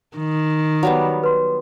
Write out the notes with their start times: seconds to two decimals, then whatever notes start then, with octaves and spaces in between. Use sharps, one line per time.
0.17 D#3
0.83 F#3 G3 B3
1.24 B4 C6